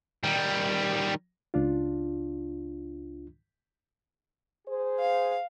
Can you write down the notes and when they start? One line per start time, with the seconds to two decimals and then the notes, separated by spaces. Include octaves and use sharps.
0.24 D#3 G3
1.54 C#2 D4 F4
4.67 G#4 C5
4.99 F5